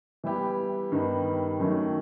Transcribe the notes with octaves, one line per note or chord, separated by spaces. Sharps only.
E3 G3 B3 E4 G4
G2 D#3 G3 B3 D#4
F#2 D#3 F#3 A3